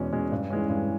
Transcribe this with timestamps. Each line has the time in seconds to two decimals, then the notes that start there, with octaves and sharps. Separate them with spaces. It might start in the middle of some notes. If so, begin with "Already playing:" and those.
Already playing: E2 B2 G#3 C#4
0.12 B2 G#3 C#4
0.32 G2
0.50 E3 G#3 C#4
0.69 G2